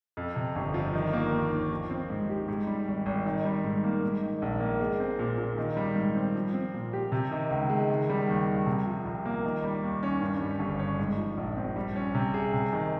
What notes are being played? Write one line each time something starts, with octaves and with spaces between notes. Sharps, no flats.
F2
C3
G1
F3
D#3
A#3
D#2
D#2
F3
C4
G#2
G4
G#2
G3
G#1
G#1
D#3
G3
G#2
A#3
G#2
D#3
A#1
A#3
G#3
C4
A#2
A#2
D#3
G3
G#2
C4
F3
C4
A#2
G4
C3
D#3
C#2
G#3
D#3
G3
D#2
D#2
C3
F3
C2
A#3
D#3
G3
D#2
C#4
G2
G3
G1
C#4
G#2
F3
A#1
C4
G3
C#4
C3
G#4
C3
D#3